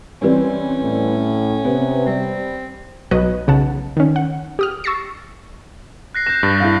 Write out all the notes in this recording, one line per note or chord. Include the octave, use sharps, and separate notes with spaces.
E3 G3 C4 C#4
A2
C3 B3
G3 C4
B1 F#3 B4 D#5 F#6
B1 C#3 F#5 A5
D#3 C#4
F#5
G4 D#6 F6
C#6 E6 A6 A#6 C7 C#7
F#6 A#6 C7
G6 A#6 E7
G2 A6
E4 F5